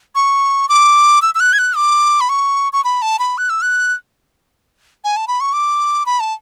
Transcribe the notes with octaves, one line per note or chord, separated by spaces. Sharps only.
C#6
D6
E6
E6
F#6
G#6
F#6
D6
B5
C#6
C#6
B5
A5
B5
F#6
E6
F#6
G#5
A5
B5
C#6
D6
B5
A5